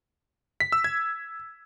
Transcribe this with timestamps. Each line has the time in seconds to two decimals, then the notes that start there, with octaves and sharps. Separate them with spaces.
0.60 B6
0.72 E6
0.84 G#6